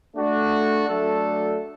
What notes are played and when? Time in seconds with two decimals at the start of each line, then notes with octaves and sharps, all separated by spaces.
0.15 A3 D4 F#4
0.88 F#3 A3 D4 A4